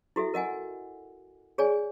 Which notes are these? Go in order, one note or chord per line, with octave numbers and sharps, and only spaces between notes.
E4 F#4 A4 E5
A#4 D#5 F#5 G#5
G#4 C#5 D5 G#5